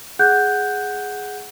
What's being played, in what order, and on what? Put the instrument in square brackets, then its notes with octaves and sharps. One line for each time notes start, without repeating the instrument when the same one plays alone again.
[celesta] G#4 F#5 F#6 G6